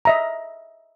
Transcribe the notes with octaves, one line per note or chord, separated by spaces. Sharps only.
D#5 E5 A#5